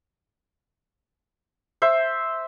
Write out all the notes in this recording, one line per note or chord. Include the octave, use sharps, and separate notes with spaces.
C5 E5